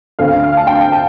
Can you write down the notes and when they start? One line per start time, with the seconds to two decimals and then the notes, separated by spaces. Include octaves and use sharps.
0.19 D2 D3 A3 C4 F5
0.43 F5
0.57 A5
0.67 G5
0.92 A5